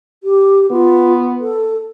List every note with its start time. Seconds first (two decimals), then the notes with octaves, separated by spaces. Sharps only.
0.24 G4
0.71 B3 F4
1.40 A4